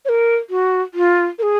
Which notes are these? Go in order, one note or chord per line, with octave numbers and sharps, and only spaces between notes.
C#5
A#4
F#4
F4
A#4
G#4